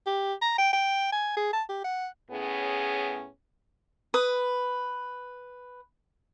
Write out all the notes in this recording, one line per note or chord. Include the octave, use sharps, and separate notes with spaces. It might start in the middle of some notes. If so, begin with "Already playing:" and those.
G4
A#5
G5
G5
G#5
G#4
A5
G4
F#5
A2 B3 C#4 G#4
B4 D#6